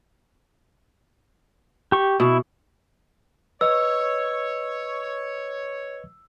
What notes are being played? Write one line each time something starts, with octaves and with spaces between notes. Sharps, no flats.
G4 C#6
B2 E4
B4 C#5 D#5 E6